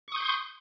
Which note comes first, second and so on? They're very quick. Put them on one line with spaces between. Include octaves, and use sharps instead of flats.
C#6 D#6 G6 C6